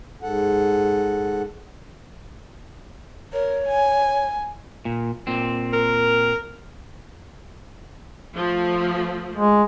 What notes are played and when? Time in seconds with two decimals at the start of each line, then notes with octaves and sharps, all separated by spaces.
0.22 G#2 A4 F#5
3.33 A#4 C#5
3.66 G#5
4.85 A#2
5.27 A#2 C4
5.73 A#4
8.35 F3 A3
9.34 G#3